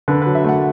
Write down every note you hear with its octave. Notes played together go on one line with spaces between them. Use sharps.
D3 B4
F#3 B4
E5
A3 F#5